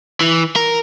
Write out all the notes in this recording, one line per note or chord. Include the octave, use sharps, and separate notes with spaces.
E3
A#4